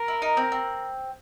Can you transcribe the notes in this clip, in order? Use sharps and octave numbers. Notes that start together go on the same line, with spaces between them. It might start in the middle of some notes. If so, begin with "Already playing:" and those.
Already playing: A#4
E4
D#4
C4
C4